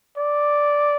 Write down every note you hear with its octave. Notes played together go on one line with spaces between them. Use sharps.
D5